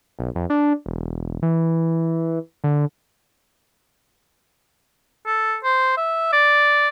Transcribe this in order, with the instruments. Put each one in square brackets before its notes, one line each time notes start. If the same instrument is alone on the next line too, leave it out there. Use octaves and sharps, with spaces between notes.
[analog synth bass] B1
F2
D4
E1
E3
D3
[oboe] A4
C5
E5
D5